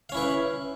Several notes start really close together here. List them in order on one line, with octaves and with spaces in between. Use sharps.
F5 C#4 E4 B4